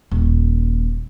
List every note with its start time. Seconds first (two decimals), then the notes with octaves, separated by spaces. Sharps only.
0.11 D#1